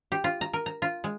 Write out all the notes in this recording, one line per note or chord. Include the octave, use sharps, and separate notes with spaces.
G4
F4
A#5
A#4
A#5
F4
G#3